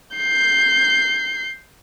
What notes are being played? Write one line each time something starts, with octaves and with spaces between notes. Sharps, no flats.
G6 C7